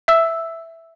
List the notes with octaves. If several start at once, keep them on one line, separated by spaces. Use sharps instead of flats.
E5 E6